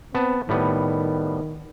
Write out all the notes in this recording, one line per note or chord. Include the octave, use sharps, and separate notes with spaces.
B3 C4 A5
A2 D#3 G3 B3